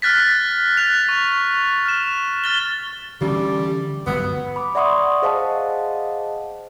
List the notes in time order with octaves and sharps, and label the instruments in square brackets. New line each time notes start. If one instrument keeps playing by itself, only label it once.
[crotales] F6 F#6 A6 B6
F#6 B6 F7
C#6
F6 E7
F6 A6 G7
[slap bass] D3 E3 C#4 [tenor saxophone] G3
[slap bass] G1 G2 F#3 [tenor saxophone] B3
[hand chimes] B5 D6
D5 E5 F#5 C6 C#6 D#6
G#4 C5 D#5 F5 F#5 A5